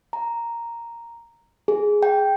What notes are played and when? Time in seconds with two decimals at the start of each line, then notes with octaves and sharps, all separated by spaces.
0.13 A#5
1.68 G#4
2.03 G5